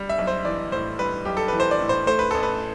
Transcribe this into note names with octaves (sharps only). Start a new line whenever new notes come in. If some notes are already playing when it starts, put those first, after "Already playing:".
Already playing: G3
E5
B1
C5
E3 D5
A2 C5
G3 B4
B1 G4
A4
E3 B4
C5
D5
A2
C5
A3 C5
B4
A1 A4
B4